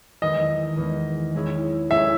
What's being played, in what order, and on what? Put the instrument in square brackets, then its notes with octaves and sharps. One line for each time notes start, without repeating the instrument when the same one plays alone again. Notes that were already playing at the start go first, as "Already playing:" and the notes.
[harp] E2 D#3 G#3 [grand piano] D#5
[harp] E2 D#3 G#3
G#3 C#4 E4 G#4
[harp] G#3 C#4 E4 G#4 [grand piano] E5